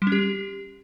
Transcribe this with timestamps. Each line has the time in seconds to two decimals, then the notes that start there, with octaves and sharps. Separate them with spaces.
0.02 G3
0.07 C#4
0.12 G4